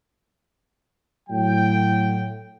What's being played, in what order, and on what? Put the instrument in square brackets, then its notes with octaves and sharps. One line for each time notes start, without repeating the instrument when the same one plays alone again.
[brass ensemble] A2 F#3 G5